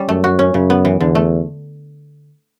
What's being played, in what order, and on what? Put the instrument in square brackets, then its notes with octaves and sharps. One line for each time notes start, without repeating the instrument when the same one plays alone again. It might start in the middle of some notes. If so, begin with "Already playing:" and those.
Already playing: [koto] G3 C#4
[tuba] F#2 [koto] A3
[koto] F#4
C#4
[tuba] F#2 [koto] C#3
[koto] B3
E3
[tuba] E2 [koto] D3
[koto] A3